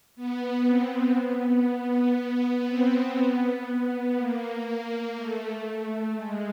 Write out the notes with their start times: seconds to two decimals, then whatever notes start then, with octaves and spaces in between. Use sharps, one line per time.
0.16 B3
0.67 C4
1.16 B3
2.67 C4
3.17 B3
3.66 B3
4.16 A#3
4.66 A#3
5.16 A3
6.17 G#3